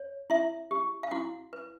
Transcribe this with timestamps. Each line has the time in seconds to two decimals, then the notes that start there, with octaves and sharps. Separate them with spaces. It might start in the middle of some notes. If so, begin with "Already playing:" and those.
Already playing: C#5
0.30 E4 E5
0.71 G4
1.03 F5
1.11 E4 F#4 F#5
1.53 B4